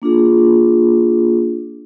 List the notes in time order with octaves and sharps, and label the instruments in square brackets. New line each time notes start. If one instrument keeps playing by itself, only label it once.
[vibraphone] A#3 D4 F4 G#4